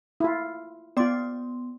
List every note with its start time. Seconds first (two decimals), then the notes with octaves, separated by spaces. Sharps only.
0.20 E4 F4
0.97 B3 F4 D5 C6